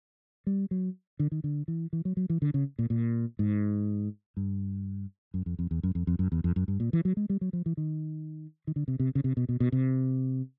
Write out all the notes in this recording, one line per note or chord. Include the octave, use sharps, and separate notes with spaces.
G3
F#3
D3
D#3
D3
E3
E3
F#3
F#3
E3
D3
C#3
A#2
A#2
G#2
G2
F#2
F2
F2
E2
F#2
F2
F2
F#2
E2
F2
F#2
G2
A#2
E3
F#3
G#3
G3
F#3
F3
E3
D#3
D#3
D3
C3
C3
C#3
C3
B2
B2
B2
C3